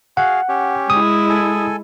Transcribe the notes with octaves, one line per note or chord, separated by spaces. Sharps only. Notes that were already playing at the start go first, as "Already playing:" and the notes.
F#4 G#4 F5 F#5
C#4 G4
G#3 E4 D#6
A4 G#5